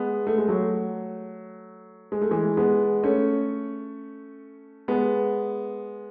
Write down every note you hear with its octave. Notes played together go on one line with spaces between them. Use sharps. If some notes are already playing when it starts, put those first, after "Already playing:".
Already playing: G#3 B3
A3
G#3
F#3 A3
G#3
A3
E3 G#3
G#3 B3
A3 C#4
G#3 B3